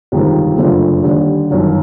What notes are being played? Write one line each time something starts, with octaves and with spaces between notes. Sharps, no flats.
G1 F2 C3 D#3 G#3
F#1 F2 D3 F3 A3
D#2 D3 G3
G1 F#2 D#3 F#3